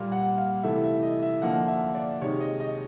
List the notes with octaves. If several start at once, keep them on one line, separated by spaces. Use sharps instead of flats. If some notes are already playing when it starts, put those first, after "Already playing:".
Already playing: A#2 G3 A#3 F5
F#5
F5
C3 E3 A3 E5
E5
D#5
E5
D3 F3 A#3 F#5
E5
D5
C3 D#3 G#3 C#5
D#5
D#5